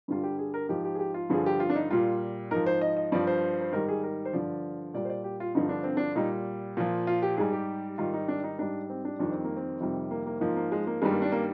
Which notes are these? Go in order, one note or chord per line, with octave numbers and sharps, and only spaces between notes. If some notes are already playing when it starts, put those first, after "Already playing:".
G2 D3 G3 F4
G4
G#4
A#4
G#2 F3 G4
G4
G#4
G4
F4
G2 D3 F3 G#4
G4
F4
D4
D#4
A#2 G3 F4
G#2 F3 A#4
C5
D#5
D#5
G2 F3 D5
C5
C5
G#2 D#3 G3 A#4
G#4
A#4
C5
G2 D3 F3 D5
A#2 G3 D5
C5
D5
G4
F4
G2 D3 F3 D#4
D4
C4
D4
A#2 G3 D#4
A#2 F3
F4
G4
G#2 G3 G#4
G4
G#2 D#3 G3 F4
D#4
D4
D#4
G#2 G3 D4
C4
D4
F2 D#3 G3 D4
C4
A#3
C4
F2 C3 D#3 G3
A#3
A#3
G#2 F3 A#3
A#3
G#3
A#3
G2 D#3 G3 G#3
A#3
D4
A#3